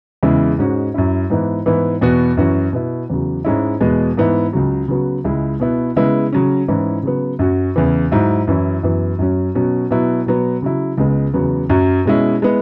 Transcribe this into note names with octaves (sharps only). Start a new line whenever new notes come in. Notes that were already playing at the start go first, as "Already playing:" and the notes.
E2 C#3 G#3 E4
G#2 G#3 C#4 F#4
F#2 F#3 C#4 E4
G#2 E3 B3 E4
G#2 E3 B3 E4
E2 B2 B3 F#4
F#2 E3 C#4 F#4
B2 B3 E4
E2 C#3 F#3
G#2 G#3 C#4 E4
E2 B2 G#3 B3
G#2 E3 B3 E4
C#2 C#3 F#3
C#3 F#3 B3 F#4
C#2 C#3 G#3 E4
B2 B3 E4
C#3 G#3 B3 E4
C#3 F#3 C#4
G#2 E3 C#4 E4
C#3 F#3 B3
F#2 F#3 C#4 F#4
E2 C#3 E3
G#2 F#3 E4
F#2 E3 C#4 E4
F#2 E3 B3
F#2 F#3 C#4
B2 F#3 C#4
B2 F#3 B3 E4
B2 F#3 B3
C#3 F#3 E4
C#2 C#3 G#3 B3
E2 C#3 F#3 B3
F#2 F#3 C#4
B2 G#3 C#4 E4
G#3 B3 E4